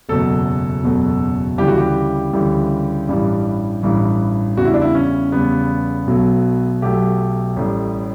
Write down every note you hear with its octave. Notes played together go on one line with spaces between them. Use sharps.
F#1 E2 B2 F#3 A3 A4
F#1 E2 B2 F#3 A3
D2 C#3 E3 G3 G4
F#4
G4
D2 C#3 E3 G3
A1 G2 E3 G3
A1 G2 E3 G3
E2 C#3 G3 F#4
E4
D4
E4
C#4
E2 C#3 G3 B3
B1 B2 F#3 A3
B1 B2 F#3 A3 G4
A1 A2 G3